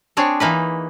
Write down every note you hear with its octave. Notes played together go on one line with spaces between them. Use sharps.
C4 D4 G#4 C#5
E3 A#3 D#4 B4